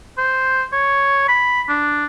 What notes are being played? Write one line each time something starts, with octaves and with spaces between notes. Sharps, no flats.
C5
C#5
B5
D4